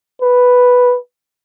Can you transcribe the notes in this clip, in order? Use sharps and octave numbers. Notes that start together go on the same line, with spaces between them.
B4